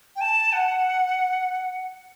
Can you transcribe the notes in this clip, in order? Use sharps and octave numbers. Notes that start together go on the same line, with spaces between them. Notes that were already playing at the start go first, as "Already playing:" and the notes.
G5
A5
F#5